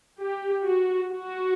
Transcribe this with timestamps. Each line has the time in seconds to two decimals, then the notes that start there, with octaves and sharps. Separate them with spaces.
0.21 G4
0.66 F#4
1.11 F#4